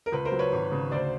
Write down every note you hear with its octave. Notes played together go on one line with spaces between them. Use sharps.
A#4
C#2 B4
A#4 C5
F#3
B4 C#5
G#1
C#3
D2 C5 D5